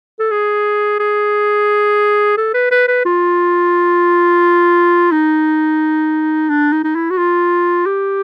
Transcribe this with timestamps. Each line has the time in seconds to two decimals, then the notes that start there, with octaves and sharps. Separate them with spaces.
0.19 A4
0.31 G#4
1.00 G#4
2.38 A4
2.54 B4
2.71 B4
2.88 B4
3.05 F4
5.12 D#4
6.50 D4
6.72 D#4
6.84 D#4
6.95 E4
7.10 F#4
7.18 F4
7.86 G4